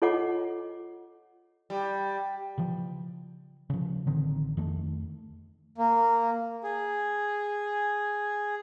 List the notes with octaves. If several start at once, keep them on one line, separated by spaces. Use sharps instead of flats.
F4 A4 C#5 D#5 F#5 D6
G3
C#3 E3 F3
C#3 F3
A1 D3 D#3 C4
F2 D#3 A3
A#3
G#4